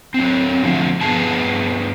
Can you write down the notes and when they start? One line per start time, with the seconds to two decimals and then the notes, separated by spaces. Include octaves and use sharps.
0.14 F#3 C4
0.63 D3 F3 A3 C4
1.01 G2 B3 G#4 G#5 A5